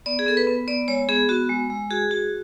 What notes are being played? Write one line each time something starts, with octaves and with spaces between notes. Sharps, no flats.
B3 D5
G#4
B3 A4
B4
B3
B3 D5
G#3 C#5
B3 G#4
B3 F#4
G#3
G#3
F#4 G#4
F#4